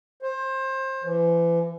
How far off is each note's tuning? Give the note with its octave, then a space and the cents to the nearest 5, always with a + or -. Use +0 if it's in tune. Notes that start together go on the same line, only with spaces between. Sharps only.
C5 +25
E3 +35